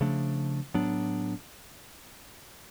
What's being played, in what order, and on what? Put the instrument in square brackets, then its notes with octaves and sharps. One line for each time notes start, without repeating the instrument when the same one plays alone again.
[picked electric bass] C#3 F3 A3 D4
A2 F#3 B3 D4